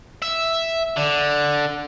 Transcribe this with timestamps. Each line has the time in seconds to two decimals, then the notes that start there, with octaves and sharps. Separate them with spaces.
0.22 E5
0.97 D3